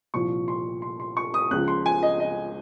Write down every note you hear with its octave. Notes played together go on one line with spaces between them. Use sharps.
C2 A#2 F3 C#6
C6
C6
C6
C#6
D#6
C#2 C#3 F3 F#6
C6
G#5
D#5
D#5